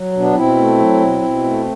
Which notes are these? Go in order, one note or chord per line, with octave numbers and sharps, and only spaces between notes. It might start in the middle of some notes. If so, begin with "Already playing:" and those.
Already playing: F#3
B2
B3 D4
B2 C4 E4
A3
F#3
B2
B2
A3